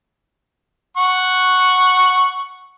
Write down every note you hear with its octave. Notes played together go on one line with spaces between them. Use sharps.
F#5 C#6